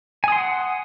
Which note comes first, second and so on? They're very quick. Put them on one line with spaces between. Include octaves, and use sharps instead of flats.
G#5 D#6 C6 F#5